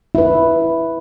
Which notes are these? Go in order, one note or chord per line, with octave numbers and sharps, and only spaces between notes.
E4 B4